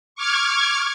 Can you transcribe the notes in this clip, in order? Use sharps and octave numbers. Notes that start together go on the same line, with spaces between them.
C#6 D6 F6 G#6